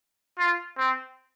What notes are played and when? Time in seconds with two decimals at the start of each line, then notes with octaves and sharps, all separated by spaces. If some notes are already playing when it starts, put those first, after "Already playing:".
0.39 F4
0.78 C4